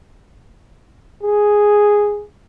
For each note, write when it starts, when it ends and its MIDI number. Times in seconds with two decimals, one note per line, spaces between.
1.23 2.24 68